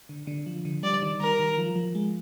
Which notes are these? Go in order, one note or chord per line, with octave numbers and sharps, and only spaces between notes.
D3
D3
F3
D3
G3 D5
D#3
G3 A#4
D#3
F3
F3
G#3